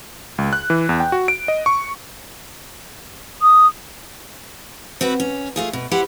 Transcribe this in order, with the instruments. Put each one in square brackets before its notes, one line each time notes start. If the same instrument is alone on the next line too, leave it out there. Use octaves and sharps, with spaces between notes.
[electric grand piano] C#2
F#6
E3
E2
G5
F#4
D7
D#5
C#6
[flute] D#6
[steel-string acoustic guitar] C4 F#4 B4
C#4
A3 F4 G#4
B2
E4 G4 B4 C5 F#5